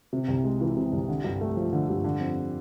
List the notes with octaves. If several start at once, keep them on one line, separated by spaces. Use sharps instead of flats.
C3
C2
G#3
E3
C3
C2
D3
G2
A3
F3
D3
G2
D3
F2